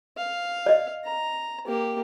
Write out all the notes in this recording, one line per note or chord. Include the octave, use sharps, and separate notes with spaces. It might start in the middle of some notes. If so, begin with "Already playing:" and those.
F5
D5 D#5
A#5
A#3 G4